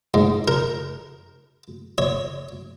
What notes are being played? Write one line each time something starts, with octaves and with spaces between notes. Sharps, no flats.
G#2
A#4
C#5